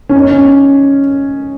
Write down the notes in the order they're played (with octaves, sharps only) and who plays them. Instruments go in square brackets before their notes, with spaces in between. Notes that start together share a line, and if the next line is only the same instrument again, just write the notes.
[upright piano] C#4
D#4
C#4